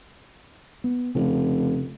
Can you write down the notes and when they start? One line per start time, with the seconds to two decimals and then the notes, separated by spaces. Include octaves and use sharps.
0.84 B3
1.15 F1 C#3